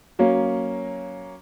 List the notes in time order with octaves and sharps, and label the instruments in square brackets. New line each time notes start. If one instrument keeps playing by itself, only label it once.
[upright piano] F#3 A#3 C#4